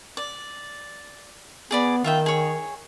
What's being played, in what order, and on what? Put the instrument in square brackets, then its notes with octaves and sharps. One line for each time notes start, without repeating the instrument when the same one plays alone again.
[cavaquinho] D5
[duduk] B3 [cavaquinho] G#4 D5 B5
[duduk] D#3 [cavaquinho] F4 E5 G5
[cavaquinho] G#4 C#5